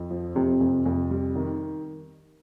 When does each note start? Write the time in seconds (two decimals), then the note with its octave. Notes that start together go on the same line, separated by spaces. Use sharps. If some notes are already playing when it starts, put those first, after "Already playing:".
Already playing: F2
0.10 F3
0.35 F2 C3
0.60 F2
0.86 F2
1.11 G3
1.36 D#3